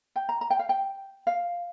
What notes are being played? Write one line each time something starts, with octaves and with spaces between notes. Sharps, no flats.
G5
A#5
A#5
G5
F5
G5
F5